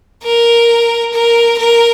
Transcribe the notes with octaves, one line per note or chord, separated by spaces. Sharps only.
A#4
A#4
A#4